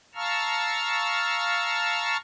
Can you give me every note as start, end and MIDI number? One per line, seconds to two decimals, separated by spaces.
0.15 2.17 77
0.15 2.17 81
0.15 2.17 82
0.15 2.17 85
0.15 2.17 88
0.15 2.17 89